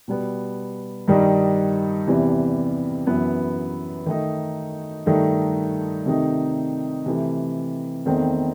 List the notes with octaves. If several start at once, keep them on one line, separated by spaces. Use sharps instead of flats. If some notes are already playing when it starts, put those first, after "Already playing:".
B2 G3 B3
G2 D#3 G3 D#4
E2 C3 E3 G3
F#2 E3 B3
D#3 A3 D#4
G2 D#3 A3 D#4
C3 D#3 A3 D#4
C3 E3 A3
E2 D#3 A3 C4 D#4